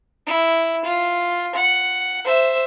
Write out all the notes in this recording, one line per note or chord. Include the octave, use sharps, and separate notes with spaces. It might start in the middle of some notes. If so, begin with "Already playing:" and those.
E4
F4
F#5
C5 E5